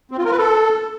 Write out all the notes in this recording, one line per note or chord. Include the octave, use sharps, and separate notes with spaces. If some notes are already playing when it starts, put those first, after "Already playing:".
C4
F4
A#4
B4
A4